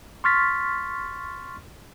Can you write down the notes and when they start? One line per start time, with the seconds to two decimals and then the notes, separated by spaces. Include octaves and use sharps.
0.24 C6 C#6 F6 A6 B6